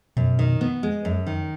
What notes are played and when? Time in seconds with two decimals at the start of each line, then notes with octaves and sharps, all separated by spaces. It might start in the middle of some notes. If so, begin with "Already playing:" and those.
0.17 F#2 B2
0.39 D#3
0.61 B3
0.83 G#3
1.05 F#2
1.26 D#3